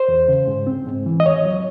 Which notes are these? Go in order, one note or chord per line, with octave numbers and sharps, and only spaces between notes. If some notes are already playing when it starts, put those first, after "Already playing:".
Already playing: C5
E2
C#3
G#2
C4
G#2
E3
D#5
D#2 C#5
F#3